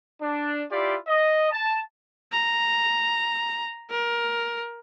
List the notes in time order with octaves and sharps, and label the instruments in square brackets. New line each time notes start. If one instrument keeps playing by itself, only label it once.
[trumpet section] D4
E4 F4 G4 D5
D#5
A5
[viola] A#5
A#4